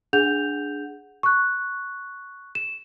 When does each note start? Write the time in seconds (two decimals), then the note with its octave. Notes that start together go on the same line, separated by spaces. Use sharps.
0.13 D4 G#4 F#5 G6 F7
1.23 C#6 F#6
2.55 E7